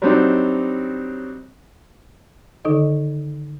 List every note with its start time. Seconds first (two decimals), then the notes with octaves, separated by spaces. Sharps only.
0.02 F#3 G3 C4 D4 D#4
2.65 D3 D#3 D#4 A4 D#5